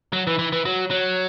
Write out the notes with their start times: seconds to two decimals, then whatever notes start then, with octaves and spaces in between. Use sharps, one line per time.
0.13 F#3
0.27 E3
0.39 E3
0.52 E3
0.65 F#3
0.91 F#3